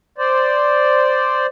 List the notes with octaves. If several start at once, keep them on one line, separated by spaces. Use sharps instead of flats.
C5 D5